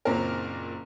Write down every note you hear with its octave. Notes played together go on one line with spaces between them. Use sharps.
F#1 A#2 C4 A#4